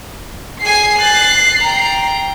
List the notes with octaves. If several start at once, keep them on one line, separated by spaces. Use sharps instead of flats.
G#4 G#5 C7
F#6 A6
G5 A#5